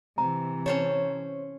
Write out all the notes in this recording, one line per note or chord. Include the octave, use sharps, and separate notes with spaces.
C3 E3 C4 A#5
C4 C#4 C5 C#5 A5